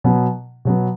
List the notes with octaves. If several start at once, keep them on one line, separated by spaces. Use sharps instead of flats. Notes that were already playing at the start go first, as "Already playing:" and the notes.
B2 F#3 B3
B2 F#3 B3